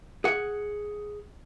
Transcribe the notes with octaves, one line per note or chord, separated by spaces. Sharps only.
G#4 F#5